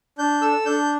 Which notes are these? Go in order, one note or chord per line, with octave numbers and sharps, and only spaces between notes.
D4 G6
A4 E6
D4 G6